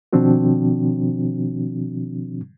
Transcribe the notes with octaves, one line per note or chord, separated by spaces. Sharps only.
B2 D#3 F3 C4 D4 F#4